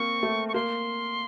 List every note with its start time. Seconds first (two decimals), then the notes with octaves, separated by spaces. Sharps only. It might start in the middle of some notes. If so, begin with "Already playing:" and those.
Already playing: A#3 C4 C#6
0.23 A3
0.48 C#6
0.54 A#3 C6